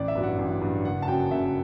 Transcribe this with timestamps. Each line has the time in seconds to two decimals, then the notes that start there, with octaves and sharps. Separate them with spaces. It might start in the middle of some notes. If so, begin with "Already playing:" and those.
Already playing: A1 D5
0.08 E5
0.15 G2 F#3
0.23 F#5
0.39 A1
0.61 G2 F#3
0.85 F#1 F#5
1.02 A5
1.07 F#2 C#3 F#3 G5
1.31 F#1 E5